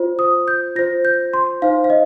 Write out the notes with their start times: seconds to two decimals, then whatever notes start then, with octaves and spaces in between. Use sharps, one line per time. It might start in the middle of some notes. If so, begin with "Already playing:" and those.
Already playing: F4 C5
0.19 D#6
0.48 G6
0.75 F4 C5 A#6
1.05 G6
1.33 C6
1.62 D#4 C5 F5
1.84 F5
1.90 D#5